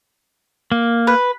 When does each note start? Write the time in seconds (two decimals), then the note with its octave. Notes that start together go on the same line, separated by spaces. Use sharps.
0.72 A#3
1.07 B4